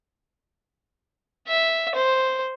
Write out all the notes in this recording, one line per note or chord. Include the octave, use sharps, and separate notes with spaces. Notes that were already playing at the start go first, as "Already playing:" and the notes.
E5
C5